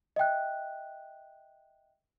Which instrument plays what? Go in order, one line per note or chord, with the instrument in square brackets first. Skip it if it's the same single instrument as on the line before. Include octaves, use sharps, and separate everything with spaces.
[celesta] D#5 E5 G5 F#6